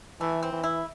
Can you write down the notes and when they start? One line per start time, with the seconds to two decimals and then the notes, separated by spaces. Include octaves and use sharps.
0.21 E3 A3
0.43 C4
0.52 E3
0.64 E4